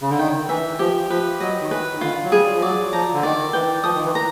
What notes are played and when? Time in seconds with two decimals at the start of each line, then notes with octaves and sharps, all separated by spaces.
0.02 C#3
0.10 D3
0.19 D#3 G5
0.49 E3 E5
0.79 F3 G4
1.10 F3 B4
1.40 F#3 D#5
1.61 D#3
1.71 E3 B4
1.95 D#3
2.01 D3 F4
2.24 F#3
2.32 G3 G#4
2.55 F3
2.62 F#3 D5
2.93 F3 A#5
3.14 D3
3.23 D#3 D5
3.53 E3 G5
3.84 F3 D#6
3.95 D#3
4.05 E3
4.15 A#5